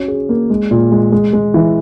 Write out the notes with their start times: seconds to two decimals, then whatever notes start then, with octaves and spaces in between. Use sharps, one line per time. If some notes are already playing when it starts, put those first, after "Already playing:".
Already playing: C#4 F#4
0.08 G#4
0.29 A#3
0.50 G#3
0.71 A#2
0.92 G#3
1.12 G#3
1.33 G#3
1.54 E3